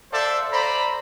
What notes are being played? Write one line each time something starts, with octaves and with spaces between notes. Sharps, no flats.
A4 C5 D5 E5 F5 A5
C5 D5 A#5 B5